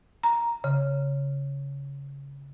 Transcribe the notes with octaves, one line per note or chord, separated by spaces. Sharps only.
A#5
C#3